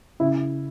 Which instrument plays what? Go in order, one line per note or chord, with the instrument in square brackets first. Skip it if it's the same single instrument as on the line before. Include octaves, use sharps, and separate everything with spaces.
[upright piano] C#3 E4